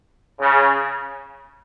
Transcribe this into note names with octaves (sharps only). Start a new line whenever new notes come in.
C#3